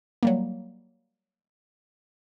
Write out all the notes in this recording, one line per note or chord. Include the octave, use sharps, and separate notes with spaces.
F#3 G3 A#3